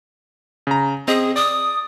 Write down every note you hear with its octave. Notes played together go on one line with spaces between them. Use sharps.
C#3 A#5
C4 G#4 D#5
D5 D#6